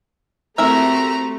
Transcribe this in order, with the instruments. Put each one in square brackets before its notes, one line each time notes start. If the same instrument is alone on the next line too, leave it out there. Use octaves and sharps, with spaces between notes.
[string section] A3 [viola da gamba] C4 F#4 G4 [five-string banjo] E4 A#4 E5 [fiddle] A#5